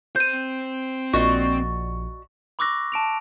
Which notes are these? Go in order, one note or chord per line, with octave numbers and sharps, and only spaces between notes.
C4 C5 G6 D#7
A#1 F#4 D5 D#5 C#6
B5 C#6 D6 E6 F#6 A#6
A5 D7 F7